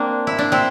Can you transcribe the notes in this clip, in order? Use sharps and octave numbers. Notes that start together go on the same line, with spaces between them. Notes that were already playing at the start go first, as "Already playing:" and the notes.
Already playing: A#3 C4 D4
E4
D4
C4 E4